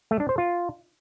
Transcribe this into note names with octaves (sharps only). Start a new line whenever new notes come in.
A3
D4
C5
F4